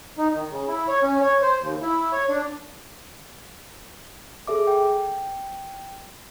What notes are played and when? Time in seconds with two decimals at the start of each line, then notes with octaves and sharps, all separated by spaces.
0.18 D#4
0.35 D#3
0.51 C#3
0.68 E4
0.88 C#5
1.03 C#4
1.21 C#5
1.42 C5
1.61 D#2
1.82 E4
2.13 C#5
2.29 D4
4.47 G#4 A4 E5 D6
4.67 G5